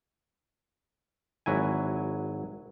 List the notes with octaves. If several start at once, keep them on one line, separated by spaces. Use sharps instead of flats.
G#1 F#3 E4 G#5